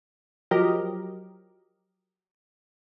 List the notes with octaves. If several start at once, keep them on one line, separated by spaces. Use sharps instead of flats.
F3 F#3 G4 A#4 D#5